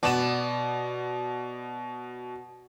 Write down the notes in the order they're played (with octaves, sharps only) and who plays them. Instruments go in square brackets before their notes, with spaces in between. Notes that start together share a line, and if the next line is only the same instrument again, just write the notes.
[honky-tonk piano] B2 E7 [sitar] B3 D5